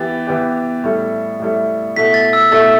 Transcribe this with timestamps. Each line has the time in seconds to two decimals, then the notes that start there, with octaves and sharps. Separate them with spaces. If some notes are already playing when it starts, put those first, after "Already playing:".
Already playing: E3 B3 G4 A6
0.27 E3 B3 G4
0.84 A2 G3 E4 A4
1.40 A2 G3 E4 A4
1.96 B2 A3 E4 A4 B6
2.14 A6
2.33 E6
2.51 B2 A3 E4 A4 A6